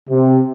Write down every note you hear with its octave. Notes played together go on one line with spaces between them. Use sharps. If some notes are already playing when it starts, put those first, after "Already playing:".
C3